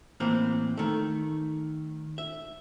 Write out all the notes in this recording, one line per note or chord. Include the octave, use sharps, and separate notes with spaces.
A2 E3 A#3 C4
D#3 A3
E5